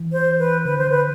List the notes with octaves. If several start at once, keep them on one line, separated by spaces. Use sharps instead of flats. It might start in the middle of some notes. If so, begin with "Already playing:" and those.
Already playing: E3
C5
B4
D3 B4
C5
B4